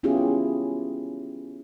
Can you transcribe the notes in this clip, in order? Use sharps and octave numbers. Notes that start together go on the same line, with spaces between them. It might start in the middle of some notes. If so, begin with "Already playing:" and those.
B3 C#4 E4 F4 G4 G#4